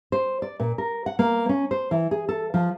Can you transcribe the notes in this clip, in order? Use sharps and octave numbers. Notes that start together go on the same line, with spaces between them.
C5
D5
A#2
A#4
F#5
A#3
C#4
C5
E3
G#4
A4
F3